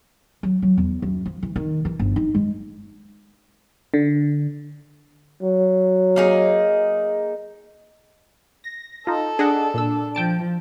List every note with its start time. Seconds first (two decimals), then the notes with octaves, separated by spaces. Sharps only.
0.43 F#3
0.62 F#3
0.78 E2
1.02 F#2
1.25 F3
1.43 E3
1.56 D#3
1.85 E3
2.00 G1
2.16 D#4
2.35 G#3
3.94 D3
5.42 F#3
6.16 A#3 D#4 G#4
8.64 A#6
9.07 D#4 F4 A4
9.39 D4 G#4 D#5 F#5
9.74 A#2 E6
10.15 F3 G5 A5 D7